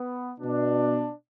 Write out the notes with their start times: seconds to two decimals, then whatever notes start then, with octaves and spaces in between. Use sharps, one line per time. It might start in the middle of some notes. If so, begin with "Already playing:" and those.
Already playing: B3
0.40 B2 D4